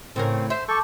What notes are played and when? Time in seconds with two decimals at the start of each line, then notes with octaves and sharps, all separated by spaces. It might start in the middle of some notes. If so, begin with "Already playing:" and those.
0.16 A2 C#3 C4 A#4
0.50 C5 E5 C6
0.69 A4 A5 C#6 D6 G6